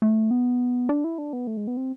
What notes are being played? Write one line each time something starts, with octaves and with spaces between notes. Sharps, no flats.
A3
B3
D4
E4
D4
B3
A3
G#3
B3
C4